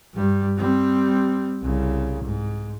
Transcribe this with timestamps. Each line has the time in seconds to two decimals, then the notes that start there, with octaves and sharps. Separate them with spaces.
0.13 G2 G3
0.57 G3 C4
1.62 C2 C#3
2.23 G#2